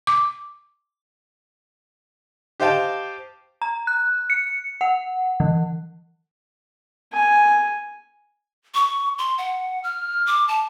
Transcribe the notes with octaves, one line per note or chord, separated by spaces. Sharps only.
D6
G4 C5 D#5 F5 G5 A5
A#5
F#6
C#7
F#5
E3
G#5
C#6
C6
F#5
F6
D6
A5